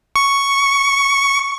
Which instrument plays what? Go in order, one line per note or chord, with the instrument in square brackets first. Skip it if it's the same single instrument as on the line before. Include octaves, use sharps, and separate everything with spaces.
[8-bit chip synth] C#6